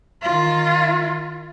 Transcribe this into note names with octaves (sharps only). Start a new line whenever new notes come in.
D#3 F4